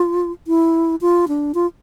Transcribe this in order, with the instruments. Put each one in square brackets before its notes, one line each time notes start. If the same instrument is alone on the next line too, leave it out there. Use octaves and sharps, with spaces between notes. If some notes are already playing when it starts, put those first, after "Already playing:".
Already playing: [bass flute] F4
E4
F4
D4
F4